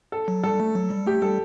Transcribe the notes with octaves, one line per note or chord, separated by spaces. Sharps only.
A4
F#3
G3 A4
A3
F#3
G3
A3 G4
G3 A4